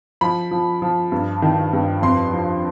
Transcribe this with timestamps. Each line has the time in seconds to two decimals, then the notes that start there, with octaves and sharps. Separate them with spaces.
0.21 F3 B5
0.51 F3
0.82 F3
1.12 G2
1.42 D#3
1.73 G2
2.02 F2 C6
2.33 F3